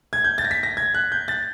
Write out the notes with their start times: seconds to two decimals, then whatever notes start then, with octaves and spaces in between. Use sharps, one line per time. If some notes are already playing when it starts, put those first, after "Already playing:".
0.13 G#6
0.24 G6
0.38 A6
0.45 A#6
0.51 B6
0.63 A#6
0.77 G#6
0.94 F#6
1.12 G6
1.28 A6